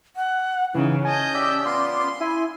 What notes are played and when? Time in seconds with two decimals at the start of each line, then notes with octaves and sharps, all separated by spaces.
0.16 F#5
0.74 C#3 E3 C#4 D#4
1.05 D#5 G#5 A5 G6
1.34 G4 D5 E5 E6
1.65 B3 F4 C6
2.20 E4 G#5